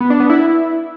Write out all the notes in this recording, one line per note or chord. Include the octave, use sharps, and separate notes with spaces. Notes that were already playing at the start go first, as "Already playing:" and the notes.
B3
D4
B3
E4